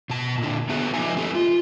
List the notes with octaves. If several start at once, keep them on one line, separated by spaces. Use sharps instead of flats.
B2 A5
A#2 D3
B3 F#4 G#4 A4 B4 E5
F3 B3 D#4 D#5 E5 G#5
A3 C4 E4 G4 A4
F4